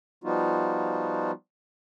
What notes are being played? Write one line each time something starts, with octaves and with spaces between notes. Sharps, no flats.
F3 G3 B3 D#4 F4 F#4